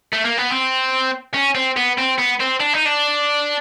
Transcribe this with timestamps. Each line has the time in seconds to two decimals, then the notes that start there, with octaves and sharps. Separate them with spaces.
0.13 A3
0.25 A#3
0.37 B3
0.50 C4
1.34 C#4
1.55 C4
1.77 B3
1.98 C4
2.18 B3
2.40 C4
2.60 D4
2.74 D#4
2.86 D4